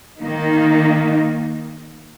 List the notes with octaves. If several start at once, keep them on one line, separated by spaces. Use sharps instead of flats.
D#3 A#3 D#4